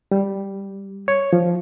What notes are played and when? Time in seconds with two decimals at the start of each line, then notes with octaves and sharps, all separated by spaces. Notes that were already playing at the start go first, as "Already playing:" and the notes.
0.12 G3
1.08 C#5
1.33 F3